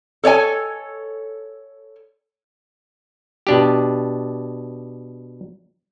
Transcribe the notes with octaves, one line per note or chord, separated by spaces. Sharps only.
A4 C#5 D5 G#5
B2 D4 G4